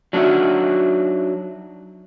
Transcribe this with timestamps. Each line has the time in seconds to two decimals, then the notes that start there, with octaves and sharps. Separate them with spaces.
0.13 F#3 D4 D#4 F4 F#4 E5